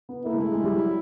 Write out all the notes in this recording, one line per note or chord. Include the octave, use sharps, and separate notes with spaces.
B3
A#3 E4
G#3
A3
G#3
G3
F#3